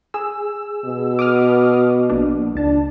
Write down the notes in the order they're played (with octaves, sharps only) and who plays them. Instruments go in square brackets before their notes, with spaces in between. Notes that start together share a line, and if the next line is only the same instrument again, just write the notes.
[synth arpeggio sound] G#4 E6
[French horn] B2
[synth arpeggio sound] D6 D#6 F6
A#1 A#3 D4
[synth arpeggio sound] C#2 A5 [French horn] D4